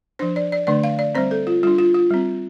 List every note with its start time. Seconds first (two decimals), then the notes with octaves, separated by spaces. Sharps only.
0.19 F3 D4 C5
0.36 D5
0.52 D5
0.67 D3 A3 D4 D5
0.84 F5
0.99 D5
1.15 G3 C4 C5
1.31 A4
1.47 F4
1.63 G3 D4 F4
1.79 F4
1.94 F4
2.10 G3 C4